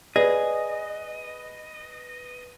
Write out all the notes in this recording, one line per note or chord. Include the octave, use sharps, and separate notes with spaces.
G#4 B4 D5 D#5